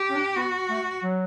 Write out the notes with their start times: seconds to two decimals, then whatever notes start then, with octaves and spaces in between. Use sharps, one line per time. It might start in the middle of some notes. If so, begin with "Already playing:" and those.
Already playing: G4
0.08 C#4
0.15 D4
0.35 B3 F#4
0.68 A3
1.01 F#3